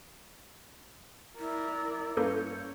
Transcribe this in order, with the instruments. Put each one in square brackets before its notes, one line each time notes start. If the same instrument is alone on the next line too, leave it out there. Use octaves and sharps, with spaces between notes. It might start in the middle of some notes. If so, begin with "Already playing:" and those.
[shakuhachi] E4 [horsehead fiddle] A#4 D5
[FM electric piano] G2 C#4 G6 [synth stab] A#3 A4 B4 [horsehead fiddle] C#5